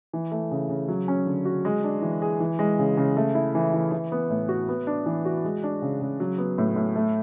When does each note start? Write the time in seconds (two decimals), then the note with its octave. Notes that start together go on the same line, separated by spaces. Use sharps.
0.13 E3
0.32 A3
0.51 C#3
0.69 C#3
0.88 F#3
1.08 C#4
1.26 D3
1.45 F#4
1.65 G#3
1.84 D4
2.02 E3
2.22 G#4
2.40 E3
2.59 G#3
2.79 C#3
2.97 C#3
3.17 A3
3.35 E4
3.55 E3
3.74 E3
3.92 E3
4.12 B3
4.30 A2
4.49 F#4
4.68 B3
4.87 D4
5.06 E3
5.25 F#4
5.44 G#3
5.63 D4
5.82 C#3
6.01 C#3
6.20 F#3
6.38 B3
6.58 A2
6.76 A2
6.96 A3